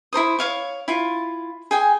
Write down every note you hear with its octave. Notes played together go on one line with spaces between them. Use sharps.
E4 A#4 C5 D#6
C#5 F5 C#6
E4 F4
G#4 G5 G#5